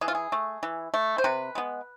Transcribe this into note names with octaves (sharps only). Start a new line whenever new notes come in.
E3 G#4
F4
G#4
A3
E3
A3
C5
C3 B4
G#3 B3